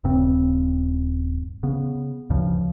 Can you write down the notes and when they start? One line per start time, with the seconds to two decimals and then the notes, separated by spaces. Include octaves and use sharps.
0.04 D#1 G2 C#3 C4
1.63 C#3 B3
2.30 D2 G2 C#3 F3